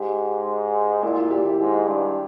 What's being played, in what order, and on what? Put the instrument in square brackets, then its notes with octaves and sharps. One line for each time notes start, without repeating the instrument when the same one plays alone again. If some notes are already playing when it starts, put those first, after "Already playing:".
Already playing: [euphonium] G#2 [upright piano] G4
[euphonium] A#2 [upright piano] E4
[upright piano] F4
G4
E4
[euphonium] G#2
G2